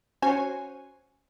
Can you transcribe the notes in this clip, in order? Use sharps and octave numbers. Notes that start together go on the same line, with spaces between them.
C#4 F#4 C5 C#5 G#5